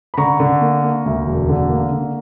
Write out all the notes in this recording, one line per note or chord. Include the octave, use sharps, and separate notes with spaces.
B5
D3 A#5 C#6
D3
A#3
A#3
D2
E1
D3
A#3
D3